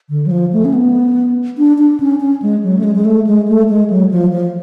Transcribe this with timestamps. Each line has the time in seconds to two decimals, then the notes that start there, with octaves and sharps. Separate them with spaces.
0.10 D3
0.26 F#3
0.31 F3
0.53 A3
0.65 C#4
0.74 B3
1.58 D4
1.79 D4
2.00 C#4
2.20 C#4
2.42 G#3
2.63 F#3
2.79 A3
2.84 G#3
2.95 G#3
3.05 A3
3.27 G#3
3.48 A3
3.69 G#3
3.90 F#3
4.11 F3
4.32 F3